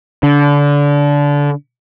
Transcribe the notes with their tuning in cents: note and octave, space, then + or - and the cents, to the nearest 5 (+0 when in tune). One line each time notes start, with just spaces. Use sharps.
D3 -25